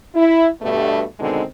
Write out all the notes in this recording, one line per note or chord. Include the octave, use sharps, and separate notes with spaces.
E4
G2 B2 A3
B2 D3 D#3 G#3 C4 D#4